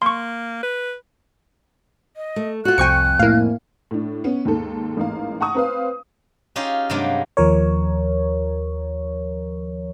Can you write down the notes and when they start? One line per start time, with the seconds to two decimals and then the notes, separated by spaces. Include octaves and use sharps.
0.02 A#3 C6 C#6
0.63 B4
2.16 D#5
2.36 A3
2.65 F4 F#4 F#6
2.78 C2 F2 G5 G#5 C#6 C#7
3.19 A2 A#3 E4 F5
3.91 A2 D4
4.24 B3 C#4
4.45 D#2 G#2 A4
4.97 A1 G#2 A#3 F5
5.41 F#5 A5 A#5 C#6 D#6
5.55 C4 B4 F5
6.56 C#4 D#4 F4 G4 G#4
6.90 G2 C3 F#3 G#3 A#3
7.37 D#2 F3 A#4 C#5